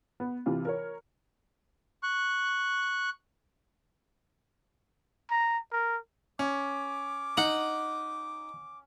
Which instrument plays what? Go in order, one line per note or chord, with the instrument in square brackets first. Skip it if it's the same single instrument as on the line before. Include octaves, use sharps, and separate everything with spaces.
[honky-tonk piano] B3
C3 E3 F4
A#4 C#5
[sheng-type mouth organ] C#6 F#6
[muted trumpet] A#5
A#4
[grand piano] C#4 [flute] D6
[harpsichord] D#4 [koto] F#5